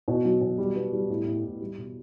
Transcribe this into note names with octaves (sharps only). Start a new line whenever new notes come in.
B2
F#3
B2
G3
B3
G3
A2
A2
A2
G3
B2